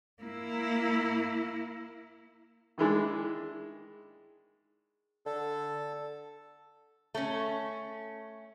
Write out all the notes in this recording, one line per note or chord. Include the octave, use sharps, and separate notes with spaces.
A#3 E4
D#3 E3 G#3 D4
D3 A4
A3 C#4